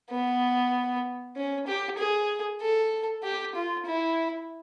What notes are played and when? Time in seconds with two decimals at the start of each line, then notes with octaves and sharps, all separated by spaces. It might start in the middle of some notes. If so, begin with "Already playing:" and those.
0.11 B3
1.37 C#4
1.67 G4
1.98 G#4
2.61 A4
3.23 G4
3.55 F4
3.86 E4